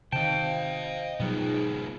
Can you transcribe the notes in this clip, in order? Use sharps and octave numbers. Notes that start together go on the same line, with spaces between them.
C3 D#3 C5 D#5 F5 G5 A5
G#2 B2 F#3 G3 B3 D#4 F4 G#4